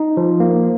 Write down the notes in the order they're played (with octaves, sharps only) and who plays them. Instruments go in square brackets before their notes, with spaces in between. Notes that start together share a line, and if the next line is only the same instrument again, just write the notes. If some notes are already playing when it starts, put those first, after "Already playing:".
Already playing: [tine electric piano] D#4
F3
A#3